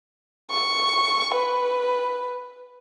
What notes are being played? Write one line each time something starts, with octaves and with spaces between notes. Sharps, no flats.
C#6
B4